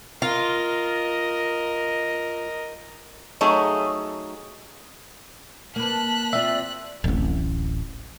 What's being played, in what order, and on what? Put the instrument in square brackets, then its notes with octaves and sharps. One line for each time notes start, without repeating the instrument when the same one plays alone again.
[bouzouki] F4 [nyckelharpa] A#4 D#5
[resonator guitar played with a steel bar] F#3 A3 D#4 G#4 C#5
[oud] A#3 B4 [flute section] A5 [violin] F#6 B6
[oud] C4 F4 [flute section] D5 [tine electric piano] E5
[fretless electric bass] D1 A1